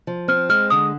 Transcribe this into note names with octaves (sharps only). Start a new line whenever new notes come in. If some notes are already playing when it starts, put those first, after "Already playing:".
F3
C4 F6
G#3 F6
D3 D#6